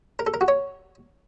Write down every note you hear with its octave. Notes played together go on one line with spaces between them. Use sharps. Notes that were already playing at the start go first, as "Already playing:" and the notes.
A#4
A4
A#4
F#4
C#5